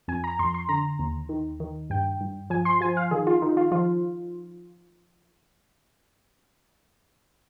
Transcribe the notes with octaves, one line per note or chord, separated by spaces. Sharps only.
F2 G#5
A#5
F2 C6
C6
D3 A#5
D#2
D#3
D#3
G2 G5
G2
F3 G#5
C6
F3 G#5
F5
D#3 G#4
F4
D#3 D#4
F4
F3 F4